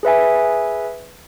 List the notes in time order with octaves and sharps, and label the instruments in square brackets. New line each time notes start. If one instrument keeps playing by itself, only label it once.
[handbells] G#4 B4 E5 G#5